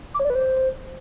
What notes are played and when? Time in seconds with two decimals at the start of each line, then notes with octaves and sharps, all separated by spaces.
0.14 D6
0.20 C#5
0.25 D5
0.30 B4
0.35 C5